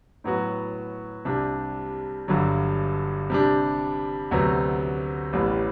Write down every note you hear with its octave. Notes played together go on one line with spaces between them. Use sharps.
A2 F#3 B3 F#4
C2 C3 G3 D4
G1 G2 D3 F#3
C3 G3 D4
D2 C3 F#3 B3
A1 A2 G3 B3